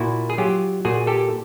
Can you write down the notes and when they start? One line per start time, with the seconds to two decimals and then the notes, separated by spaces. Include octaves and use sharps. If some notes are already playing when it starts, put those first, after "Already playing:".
Already playing: A#2 E4 F#4
0.30 G#4
0.38 F#3 F4 G4
0.85 A#2 F#4 G#4
1.07 G4 A4